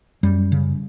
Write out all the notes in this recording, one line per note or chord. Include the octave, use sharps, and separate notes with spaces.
F#2 G3
C#3